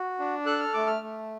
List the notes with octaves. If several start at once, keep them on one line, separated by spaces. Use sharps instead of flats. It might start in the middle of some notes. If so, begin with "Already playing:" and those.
Already playing: F#4
D4
A4 F#6
F6
A3 D6
F6
A3